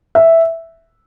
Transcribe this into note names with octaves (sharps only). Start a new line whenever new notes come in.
E5